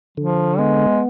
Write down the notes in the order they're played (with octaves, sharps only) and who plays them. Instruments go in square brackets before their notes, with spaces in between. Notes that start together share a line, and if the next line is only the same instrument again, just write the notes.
[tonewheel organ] D3 [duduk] F3
[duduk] G#3 [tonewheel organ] B3